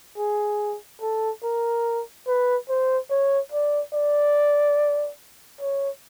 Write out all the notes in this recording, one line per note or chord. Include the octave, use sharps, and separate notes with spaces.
G#4
A4
A#4
B4
C5
C#5
D5
D5
C#5